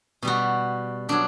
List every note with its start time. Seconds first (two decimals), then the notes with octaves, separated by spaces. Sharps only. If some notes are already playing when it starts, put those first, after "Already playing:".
0.22 B2 G3 F#4
1.09 B2 F#3 D4